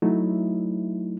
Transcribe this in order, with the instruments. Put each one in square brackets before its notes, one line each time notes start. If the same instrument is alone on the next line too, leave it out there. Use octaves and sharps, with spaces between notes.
[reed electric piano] F#3 A3 D#4 E4